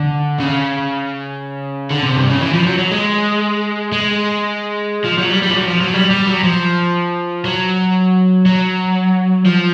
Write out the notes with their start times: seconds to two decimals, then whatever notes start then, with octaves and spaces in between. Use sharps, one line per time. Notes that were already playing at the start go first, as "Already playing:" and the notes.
Already playing: D3
0.40 C#3
1.90 D3
2.03 C3
2.16 G2
2.29 C#3
2.41 E3
2.53 F3
2.67 F#3
2.78 F#3
2.91 G#3
3.92 G#3
5.05 F3
5.19 F#3
5.30 G3
5.43 G3
5.51 F3
5.56 F#3
5.68 F3
5.81 F#3
5.94 G3
6.11 G3
6.27 F#3
6.44 F3
7.45 F#3
8.46 F#3
9.46 F3